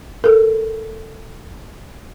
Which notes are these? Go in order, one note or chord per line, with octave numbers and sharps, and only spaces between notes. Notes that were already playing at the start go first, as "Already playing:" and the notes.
A4 A#4